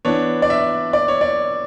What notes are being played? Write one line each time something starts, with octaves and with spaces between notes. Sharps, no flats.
E3 B3 D4 C#5
D5
E5
D5
C#5
D5